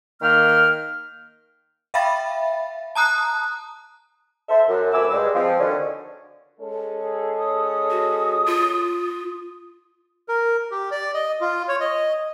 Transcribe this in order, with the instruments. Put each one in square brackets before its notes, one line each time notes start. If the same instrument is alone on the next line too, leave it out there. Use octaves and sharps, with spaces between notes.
[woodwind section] D#3 A#3 G5 F6
[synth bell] E5 F5 G5 B5 A6
A5 A#5 D#6 F#6
[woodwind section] A4 C5 E5
F#2
D2 G#5 B5 D6 E6
G2 G#3
F3 C4
D3 D#3 C#4 F#4
[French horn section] G#3 C#4 A4
[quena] G#4
D#6
[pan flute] F#4
F4
[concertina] A#4
G4
D5
D#5
F4
C#5
D#5